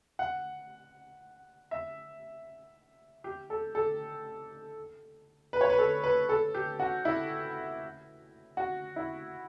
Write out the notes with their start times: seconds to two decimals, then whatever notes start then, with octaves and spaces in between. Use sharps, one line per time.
0.19 F#5
1.71 E5
3.24 G4
3.50 A4
3.75 A4
5.53 B4
5.61 C#5
5.70 B4
5.79 A4
6.04 B4
6.29 A4
6.54 G4
6.80 F#4
7.05 E4
8.57 F#4
8.96 E4